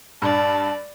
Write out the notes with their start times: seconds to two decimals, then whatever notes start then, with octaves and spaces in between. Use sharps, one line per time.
0.22 G2 D5 A5